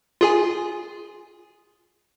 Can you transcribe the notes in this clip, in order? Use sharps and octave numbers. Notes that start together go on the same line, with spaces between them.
F4 G#4 G#5